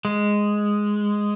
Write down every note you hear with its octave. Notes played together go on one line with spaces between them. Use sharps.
G#3